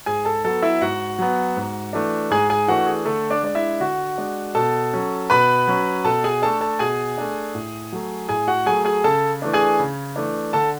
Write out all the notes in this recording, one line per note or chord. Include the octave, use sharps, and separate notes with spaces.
G#2 G#4 G#5
A4 A5
F#3 B3 A4 A5
E4 E5
G#2 F#4 F#5
F#3 B3
G#2
E3 A3 D4
G#2 G#4 G#5
G#4 G#5
E3 A3 D4 F#4 F#5
G#4
D3 A3 A4
D4 D5
G#3 D4
E4 E5
D3 F#4 F#5
G#3 D4
B2 A4 A5
F#3 C#4
B2 B4 B5
F#3 C#4
B2 A4 A5
G#4 G#5
A3 D4 A4 A5
A4 A5
B2 G#4 G#5
A3 D4
A2
F#3 A3
A2 G#4 G#5
F#4 F#5
F#3 A3 G#4 G#5
G#4 G#5
C#3 A4 A5
E3 A3 D4
G#4 G#5
C#3
E3 A3 D4
D3 A4 A5